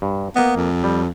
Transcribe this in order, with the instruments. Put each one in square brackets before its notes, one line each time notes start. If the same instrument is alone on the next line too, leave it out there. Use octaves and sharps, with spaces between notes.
[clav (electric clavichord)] G2
[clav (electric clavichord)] A#3 D#5 [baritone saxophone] B3
[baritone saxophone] F2
[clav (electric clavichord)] G3